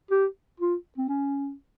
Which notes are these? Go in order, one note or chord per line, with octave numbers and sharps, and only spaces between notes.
G4
F4
C4
C#4